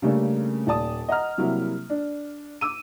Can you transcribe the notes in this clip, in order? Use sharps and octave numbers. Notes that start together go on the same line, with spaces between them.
C#3 G3 A3 A#3 C#4 D4
D#1 D5 A5 D#6
D#5 F#5 A#5 F6
C3 F#3 G3 A#3 E4
D4
D6 E6 D#7